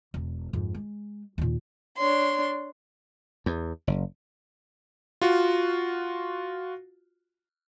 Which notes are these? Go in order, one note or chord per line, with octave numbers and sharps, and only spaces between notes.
E1
F2 G#2
G#3
D#2 A#2
D4 C#5 C6
E2
F#1
F4 F#4